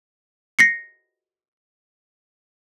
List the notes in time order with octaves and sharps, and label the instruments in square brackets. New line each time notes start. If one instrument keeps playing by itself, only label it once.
[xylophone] A#6 C7 C#7